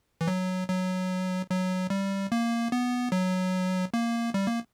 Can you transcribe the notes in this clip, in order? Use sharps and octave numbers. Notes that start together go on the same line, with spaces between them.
E3
F#3
F#3
F#3
G3
A#3
B3
F#3
A#3
G3
A#3